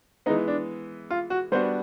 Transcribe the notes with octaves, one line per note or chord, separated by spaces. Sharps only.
E3 G#3 B3 D#4
D4
F4
F#4
G3 B3 D4 F#4 C5